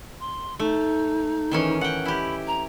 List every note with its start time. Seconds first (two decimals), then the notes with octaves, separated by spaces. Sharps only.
0.20 C6
0.59 A3 D#4
1.51 D#3 E3 C#4
1.81 F#5 G5
2.05 E4 G4 B5
2.47 A#5